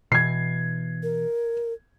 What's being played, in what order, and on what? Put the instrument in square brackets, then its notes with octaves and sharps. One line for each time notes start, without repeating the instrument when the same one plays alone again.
[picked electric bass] B2 E3 [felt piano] G#6 C7
[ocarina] A#4